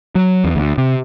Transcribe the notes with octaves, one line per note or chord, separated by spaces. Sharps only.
F#3
E2
D2
C3